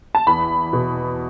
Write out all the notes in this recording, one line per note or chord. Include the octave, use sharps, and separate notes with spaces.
A5
E2 B5
B2